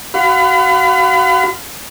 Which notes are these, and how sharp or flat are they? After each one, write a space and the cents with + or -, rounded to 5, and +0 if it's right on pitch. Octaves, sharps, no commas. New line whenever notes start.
F#4 +20 F5 +0 B5 +40